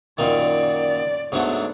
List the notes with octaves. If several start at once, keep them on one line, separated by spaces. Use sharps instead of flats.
F#2 A#2 D#3 D5
G#2 F#3 A3 B3 D4